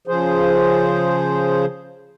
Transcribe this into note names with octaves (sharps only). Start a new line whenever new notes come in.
C#3 F3 G#4 C5